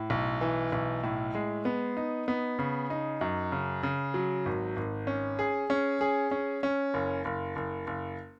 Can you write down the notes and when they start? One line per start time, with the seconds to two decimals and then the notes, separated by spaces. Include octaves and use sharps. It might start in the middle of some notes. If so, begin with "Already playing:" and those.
Already playing: A2
0.10 B1
0.41 E3
0.72 B1
1.03 A2
1.35 G#3
1.65 B3
1.97 D#4
2.28 B3
2.59 C#3
2.90 D#4
3.21 F#2
3.52 C#3
3.83 C#3
4.14 F#3
4.46 G#1
4.76 G#1
5.07 C#4
5.39 G#4
5.70 C#4
6.01 G#4
6.31 C#4
6.63 C#4
6.94 F#1
7.25 F#1
7.56 F#1
7.87 F#1